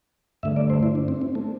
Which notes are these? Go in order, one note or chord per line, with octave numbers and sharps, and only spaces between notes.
G2 D3 A3 E5
D5
C5
E4
D4
C4
C4
A3